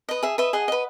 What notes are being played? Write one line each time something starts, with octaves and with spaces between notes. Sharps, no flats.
B4 D#5
G#4 E5
B4 D#5 E5
G#4 D#5 F#5
B4 D#5